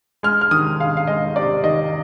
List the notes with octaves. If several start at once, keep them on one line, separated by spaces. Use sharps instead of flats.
G#3 F6
F6
D#3 D#6
G#3 F5
F5
G#3 D#5
C3 D5
D#3 D#5